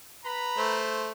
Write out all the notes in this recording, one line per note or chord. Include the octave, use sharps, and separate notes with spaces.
B4 A#5 B5
A3 C5